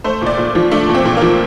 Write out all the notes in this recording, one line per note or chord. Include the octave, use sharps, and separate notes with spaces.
A3 C5
A#2
D5
A#2
F3
A3 D4
A#2
C4
A#2
F3 A#3